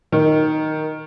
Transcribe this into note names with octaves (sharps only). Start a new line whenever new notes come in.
D#3